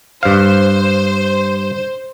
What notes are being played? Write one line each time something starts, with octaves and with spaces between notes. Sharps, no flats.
G2 C5 F5